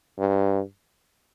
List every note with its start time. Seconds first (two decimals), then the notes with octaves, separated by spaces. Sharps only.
0.19 G2